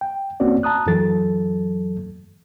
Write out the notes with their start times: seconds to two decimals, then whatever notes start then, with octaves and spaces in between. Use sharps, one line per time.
0.01 G5
0.40 C2 A#3 C4 C#4 F#4 D5
0.63 A5 A#5 D#6 F#6
0.86 F#2 E3 F#3 A4 A6